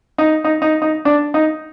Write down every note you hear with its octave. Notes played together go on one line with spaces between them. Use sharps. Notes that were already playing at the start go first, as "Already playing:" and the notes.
D#4
D#4
D#4
D#4
D4
D#4